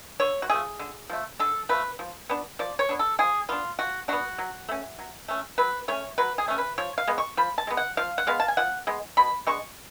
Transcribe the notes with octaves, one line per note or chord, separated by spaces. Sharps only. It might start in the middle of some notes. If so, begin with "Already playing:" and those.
D3 C#5
F#4
F3 A3 G#4
D3
F3 A3
D3 A4
F3 A3 B4
F3
B3 D4
F3 D5
C#5
B3 D4
A4
F3 G#4
B3 D4 F4
F3 F#4
B3 D4 F#4
F#3
A3 C#4
F#3
A3 C#4
F#3 B4
A3 C#4 C#5
F#3 B4
G#4
A3 C#4
B4
F3 C#5
F5
G#3 B3
C#6
F3 B5
A5
G#3 B3
F#5
F3 F5
F#5
G#3 B3 F5
A5
G#5
F3 F#5
G#3 B3
B2 B5
G#3 B3 D4 C#6